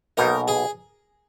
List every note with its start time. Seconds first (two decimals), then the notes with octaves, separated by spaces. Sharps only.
0.17 B1 B2 A#3 D#4 A#4
0.48 G#4